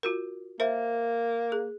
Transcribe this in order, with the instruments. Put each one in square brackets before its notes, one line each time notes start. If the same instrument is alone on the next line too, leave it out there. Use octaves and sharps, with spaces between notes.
[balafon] F4 F#4 A#4
[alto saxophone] A#3 [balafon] A#4 C5 E5
[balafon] G#4